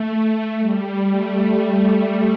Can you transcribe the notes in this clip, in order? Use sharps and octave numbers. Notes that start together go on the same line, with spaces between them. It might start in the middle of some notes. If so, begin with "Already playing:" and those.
Already playing: A3
G3
A3